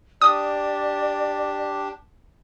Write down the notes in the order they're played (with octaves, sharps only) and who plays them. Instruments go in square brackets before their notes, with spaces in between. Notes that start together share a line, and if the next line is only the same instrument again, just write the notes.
[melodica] D4 G4 [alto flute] D5 [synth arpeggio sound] D#6